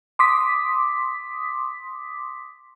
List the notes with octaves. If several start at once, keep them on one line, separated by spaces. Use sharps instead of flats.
C6 D6 D#6 B6